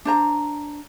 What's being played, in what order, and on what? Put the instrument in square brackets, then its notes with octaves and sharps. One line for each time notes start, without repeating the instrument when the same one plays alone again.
[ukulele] D4 C5 A#5